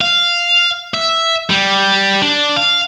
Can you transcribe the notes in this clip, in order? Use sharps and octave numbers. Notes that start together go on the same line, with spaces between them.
F5
E5
G3
D4
F5